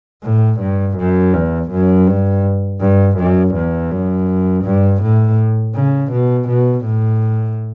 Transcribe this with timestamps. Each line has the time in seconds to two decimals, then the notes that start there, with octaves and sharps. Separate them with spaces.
0.24 A2
0.61 G2
0.98 F#2
1.34 E2
1.71 F#2
2.08 G2
2.81 G2
3.18 F#2
3.55 E2
3.91 F#2
4.64 G2
5.02 A2
5.75 C#3
6.12 B2
6.49 B2
6.86 A2